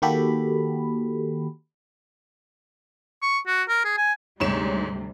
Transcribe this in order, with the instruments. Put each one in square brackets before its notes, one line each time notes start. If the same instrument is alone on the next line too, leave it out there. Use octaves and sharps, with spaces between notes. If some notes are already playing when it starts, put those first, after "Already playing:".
[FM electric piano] D#3 A#3 F#4 G4 A4 B5
[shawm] C#6
F#4
A#4
G#4
G#5
[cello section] D2 C3 G3 [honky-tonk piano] G#2 C#5 E7